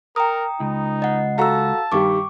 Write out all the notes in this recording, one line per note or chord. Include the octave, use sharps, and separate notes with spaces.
A#4 G5 A#5 D#6
C#2 D#4
D#5 F#5
F#4 A4 F5 A5 A#5 E6
G2 D#3 G3 C#6 D6